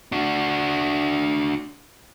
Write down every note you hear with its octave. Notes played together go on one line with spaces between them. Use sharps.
D4 F#4